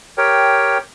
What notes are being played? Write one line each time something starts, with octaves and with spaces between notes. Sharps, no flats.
G4 A#4 C#5 G5